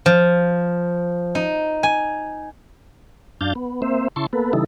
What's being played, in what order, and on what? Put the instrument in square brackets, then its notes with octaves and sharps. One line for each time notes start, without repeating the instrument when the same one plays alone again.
[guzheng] F3
D#4
G#5
[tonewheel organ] F#2 D4 F5 G6 A6
B3
A#3 C4 C5 E5
C#3 E4 A5 C6 C#6
A#3 B3 A4 B4
C#3 E3 G3 D#4 E4 A4